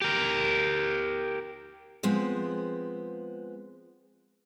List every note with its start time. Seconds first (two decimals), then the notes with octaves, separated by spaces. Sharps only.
0.02 G4 A#4
2.03 F3 G#3 B3 C4 D#5